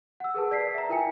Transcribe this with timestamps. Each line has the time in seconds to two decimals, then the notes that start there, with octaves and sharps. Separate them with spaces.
0.20 F#5 E6
0.34 G#4 A#4 B4 A5
0.51 D5 A5 B6 C7
0.74 E5 A#5
0.89 E4 F4 A#4 G5 G#5 C#7